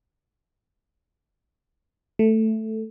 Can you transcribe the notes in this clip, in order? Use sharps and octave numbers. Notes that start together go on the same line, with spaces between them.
A3